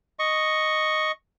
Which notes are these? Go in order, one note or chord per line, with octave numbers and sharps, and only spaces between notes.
D#5 C#6